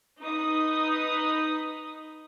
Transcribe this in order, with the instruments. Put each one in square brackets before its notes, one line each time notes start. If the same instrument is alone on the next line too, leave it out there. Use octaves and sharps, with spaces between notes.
[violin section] D#4 B4 D#6